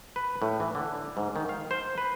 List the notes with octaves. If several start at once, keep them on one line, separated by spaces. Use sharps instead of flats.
B4
A2
E3
D3
G#2
D#3
F5
C5
B4